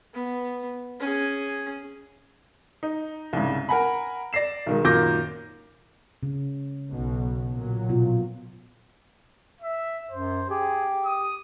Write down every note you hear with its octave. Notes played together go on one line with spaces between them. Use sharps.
B3
C#4 G#4
D#4
C2 G#2 C#3
A#4 F#5 G#5 A#5 B5
D5 A#6 C7 E7
B1 D#3 G#3
F#2 A#2 D#3 D6 G6 A#6
C#3
B1 B2
A#2 F#3
B2 F4
E5
F#2 C5
G4 G#4
D#6